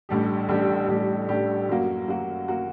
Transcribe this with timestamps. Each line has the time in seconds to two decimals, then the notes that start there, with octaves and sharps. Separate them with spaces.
0.09 A1 A2 G3 D4 G4
0.49 A1 A2 G3 D4 G4
0.88 A1 A2 G3 D4 G4
1.29 A1 A2 G3 D4 G4
1.69 F#2 F#3 A#3 F#4
2.07 F#2 F#3 A#3 F#4
2.48 F#3 A#3 F#4